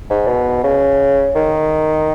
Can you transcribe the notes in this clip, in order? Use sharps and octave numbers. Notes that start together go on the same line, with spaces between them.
G#2
B2
C#3
D#3